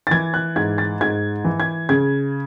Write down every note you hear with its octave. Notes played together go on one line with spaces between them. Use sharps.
A6
E3 G#6
F#6
G#2 G#6
A6
G#2 G#6
E3
G#6
C#3 G#6